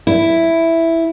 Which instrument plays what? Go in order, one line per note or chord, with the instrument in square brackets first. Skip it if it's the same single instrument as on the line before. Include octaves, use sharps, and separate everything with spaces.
[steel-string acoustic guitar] E4